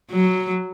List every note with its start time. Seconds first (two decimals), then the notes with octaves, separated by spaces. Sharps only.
0.11 F#3